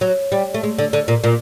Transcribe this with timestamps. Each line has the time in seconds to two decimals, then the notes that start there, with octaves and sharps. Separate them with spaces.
0.01 F#3
0.32 G3
0.54 A3
0.63 G#3
0.78 D3
0.93 D3
1.08 A#2
1.24 A#2